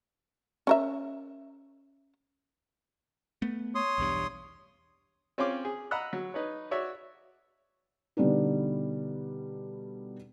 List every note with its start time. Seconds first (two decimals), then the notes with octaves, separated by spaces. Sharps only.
0.67 C#4 A#4 E5
3.42 A3 B3
3.75 C#5 C6 D#6
3.98 B1 E2 G2
5.38 C4 C#4 F4 C#5 C6 D6
5.65 G#4
5.91 D#5 F#5 A#5 B5 E6 F#6
6.13 F#3
6.34 D#4 B4 C#5
6.71 F#4 C#5 D5 E5
8.17 B2 D3 G3 B3 D4 D#4